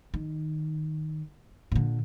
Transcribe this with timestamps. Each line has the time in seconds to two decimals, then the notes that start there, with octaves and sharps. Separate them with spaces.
0.14 D#3
1.72 A#2 D3